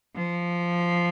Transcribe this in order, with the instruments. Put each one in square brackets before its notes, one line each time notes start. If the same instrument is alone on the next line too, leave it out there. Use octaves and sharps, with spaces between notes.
[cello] F3